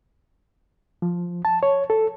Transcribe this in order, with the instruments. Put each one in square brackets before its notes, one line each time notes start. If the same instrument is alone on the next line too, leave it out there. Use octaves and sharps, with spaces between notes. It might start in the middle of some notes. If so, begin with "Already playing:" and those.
[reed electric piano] F3
A5
C#5
A4